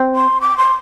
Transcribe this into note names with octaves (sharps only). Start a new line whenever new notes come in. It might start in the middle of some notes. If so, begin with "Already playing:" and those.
Already playing: C4
C6
D6
C6